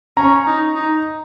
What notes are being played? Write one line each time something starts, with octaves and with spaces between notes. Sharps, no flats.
C#4 A#5
D#4
D#4